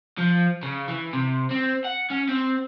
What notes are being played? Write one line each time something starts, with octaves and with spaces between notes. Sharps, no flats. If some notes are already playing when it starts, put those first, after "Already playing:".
F3
C#3
E3
C3
C4
F#5
C#4
C4